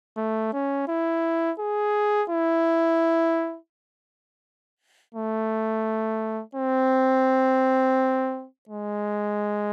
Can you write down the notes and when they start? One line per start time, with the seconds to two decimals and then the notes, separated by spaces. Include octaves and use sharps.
0.17 A3
0.53 C#4
0.88 E4
1.59 G#4
2.30 E4
5.14 A3
6.55 C4
8.69 G#3